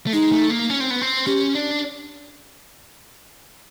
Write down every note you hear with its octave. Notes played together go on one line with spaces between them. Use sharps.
A3
G#3 D#4
A3
A#3
C#4
C4
B3
C4
C#4 G4
D4